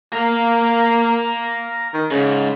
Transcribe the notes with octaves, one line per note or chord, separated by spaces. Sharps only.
A#3 A#4 F5
D#3
G#2 C#3